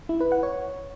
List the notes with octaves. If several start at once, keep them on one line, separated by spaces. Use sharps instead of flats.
E4
B4
F#5
C#5